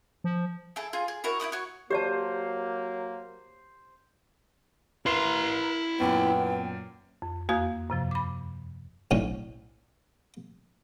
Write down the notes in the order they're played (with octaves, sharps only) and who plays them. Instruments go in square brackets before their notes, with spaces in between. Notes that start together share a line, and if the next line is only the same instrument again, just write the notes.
[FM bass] F3
[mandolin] E4 G#4 A4
F4 G#4
G#4
E4 F#4 A#4 C#5
E4 F#4 B5 D#6
F#4 C#5
[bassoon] F#3 [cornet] A#3 [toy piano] G4 D5 A5 [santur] C5
[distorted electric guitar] E4 C6 [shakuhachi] A#4 [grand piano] B4 C7 E7
[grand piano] F#2 A#2 [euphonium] B3 [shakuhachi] G5
[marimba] F2
E2 A#3 F#4 F5 D#6 G#6
F#2 C3 F3
B5 D6
[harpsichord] B1 A2 D3 C#4